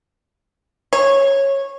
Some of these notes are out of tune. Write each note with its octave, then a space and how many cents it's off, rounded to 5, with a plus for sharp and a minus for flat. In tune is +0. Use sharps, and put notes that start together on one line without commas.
C#5 -15